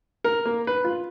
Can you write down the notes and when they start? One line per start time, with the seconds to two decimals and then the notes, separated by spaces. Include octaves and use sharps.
0.24 A#4
0.46 A#3
0.67 B4
0.84 F4